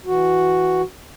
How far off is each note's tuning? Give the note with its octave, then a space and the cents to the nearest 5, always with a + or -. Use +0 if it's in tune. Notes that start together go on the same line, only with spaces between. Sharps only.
E3 +0 F#4 +0